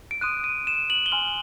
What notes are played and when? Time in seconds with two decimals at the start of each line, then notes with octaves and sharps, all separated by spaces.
0.11 D7
0.21 C6 D#6 F#6 D#7
0.44 D#7
0.67 E7
0.90 F#7
1.06 G7
1.12 G#5 C6 F6 F#7